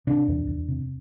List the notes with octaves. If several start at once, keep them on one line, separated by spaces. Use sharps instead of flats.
C3 D4
E2
E2
C3